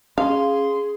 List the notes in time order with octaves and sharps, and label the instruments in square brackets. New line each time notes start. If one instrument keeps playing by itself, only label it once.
[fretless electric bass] C#4 [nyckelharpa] G#4 [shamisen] F5 [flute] C6